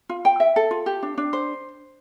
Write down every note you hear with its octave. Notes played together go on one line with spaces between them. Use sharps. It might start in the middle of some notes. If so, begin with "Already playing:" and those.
F4
G5
E5
A4
F4
G4
D4
D4
C5